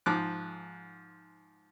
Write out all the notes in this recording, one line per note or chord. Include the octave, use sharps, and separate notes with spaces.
G#2 F3 D6 F#6